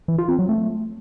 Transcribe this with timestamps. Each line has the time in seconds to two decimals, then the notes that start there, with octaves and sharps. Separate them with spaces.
0.08 E3
0.18 F4
0.29 C4
0.39 F#3
0.49 A3